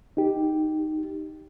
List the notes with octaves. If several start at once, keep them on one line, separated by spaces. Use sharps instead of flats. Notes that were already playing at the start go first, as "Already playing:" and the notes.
D#4 G4